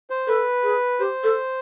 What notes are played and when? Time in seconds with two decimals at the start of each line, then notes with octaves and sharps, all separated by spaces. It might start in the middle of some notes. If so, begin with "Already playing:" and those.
0.10 C5
0.27 A4 B4
0.63 G#4
0.99 G4 C5
1.24 A4